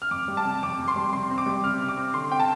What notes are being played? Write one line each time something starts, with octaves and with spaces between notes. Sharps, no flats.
F6
F2 D6
G3
A5
C3
F2 D6
F2
C6
G3
C3 C6
C4
D6
G3
C3 F6
C3
D6
C4
D3 C6
C4 G5
A5